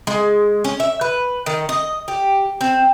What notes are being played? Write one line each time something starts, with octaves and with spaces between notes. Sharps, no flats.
G#3
C#4
E5
B4
D#3
D#5
G4
C4